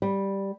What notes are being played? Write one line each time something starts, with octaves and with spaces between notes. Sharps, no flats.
G3